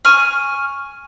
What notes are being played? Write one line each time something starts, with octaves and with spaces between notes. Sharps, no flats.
G#5 C#6 F6